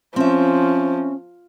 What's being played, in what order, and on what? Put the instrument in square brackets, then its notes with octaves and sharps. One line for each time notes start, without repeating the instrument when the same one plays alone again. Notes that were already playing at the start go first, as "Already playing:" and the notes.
[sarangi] F3 [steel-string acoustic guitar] C4 E5 [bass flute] C#4